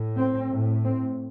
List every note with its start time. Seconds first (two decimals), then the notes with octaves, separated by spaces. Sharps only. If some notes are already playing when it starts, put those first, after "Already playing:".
Already playing: A2
0.16 C4
0.50 A2
0.84 C4